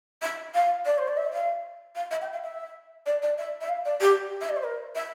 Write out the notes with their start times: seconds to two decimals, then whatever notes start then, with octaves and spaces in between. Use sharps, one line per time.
0.22 E5
0.54 F5
0.85 D5
0.98 C5
1.08 D5
1.17 E5
1.33 F5
1.95 F5
2.11 E5
2.21 G5
2.33 F5
2.43 E5
3.06 D5
3.22 D5
3.38 E5
3.61 E5
3.69 F5
3.85 D5
4.01 G4
4.41 E5
4.49 D5
4.56 C5
4.63 A#4
4.95 E5